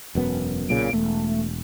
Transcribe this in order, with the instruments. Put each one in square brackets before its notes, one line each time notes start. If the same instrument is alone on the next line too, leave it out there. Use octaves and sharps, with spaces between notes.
[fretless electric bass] E1 F#2 B3
[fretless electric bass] B1 A#2 C#3 [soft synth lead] D7
[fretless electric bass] E1 [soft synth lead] A3